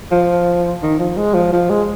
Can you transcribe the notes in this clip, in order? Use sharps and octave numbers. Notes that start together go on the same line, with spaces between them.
F3
D#3
F3
G#3
F3
F3
G#3